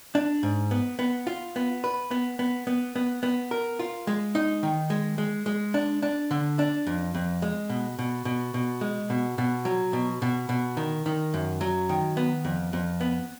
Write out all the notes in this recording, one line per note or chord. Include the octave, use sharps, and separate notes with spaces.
D4
G#2
B3
B3
F4
B3
B4
B3
B3
B3
B3
B3
A#4
F4
G#3
D#4
D#3
G#3
G#3
G#3
D4
D4
D3
D4
F2
F2
G#3
B2
B2
B2
B2
G#3
B2
B2
F#3
B2
B2
B2
D#3
D#3
F#2
F#3
D#3
B3
F2
F2
B3